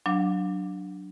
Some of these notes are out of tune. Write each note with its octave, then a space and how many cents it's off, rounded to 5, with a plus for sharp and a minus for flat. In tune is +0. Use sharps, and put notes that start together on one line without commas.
F#3 +0 D4 +0 F5 +35